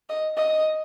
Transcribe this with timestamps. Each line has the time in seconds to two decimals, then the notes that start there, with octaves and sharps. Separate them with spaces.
0.09 D#5
0.37 D#5